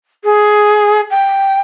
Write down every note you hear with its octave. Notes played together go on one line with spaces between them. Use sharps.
G#4
G5